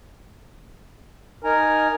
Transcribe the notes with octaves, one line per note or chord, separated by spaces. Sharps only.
D#4 A#4 G#5 A#5